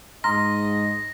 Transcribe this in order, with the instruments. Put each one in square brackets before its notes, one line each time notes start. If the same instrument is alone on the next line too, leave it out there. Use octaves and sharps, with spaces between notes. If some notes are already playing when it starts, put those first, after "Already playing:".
[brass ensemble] G#2 D#5 [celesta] A#5 C6 F6 [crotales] A#6